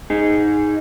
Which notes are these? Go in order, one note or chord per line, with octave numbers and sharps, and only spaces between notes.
D#4 G#4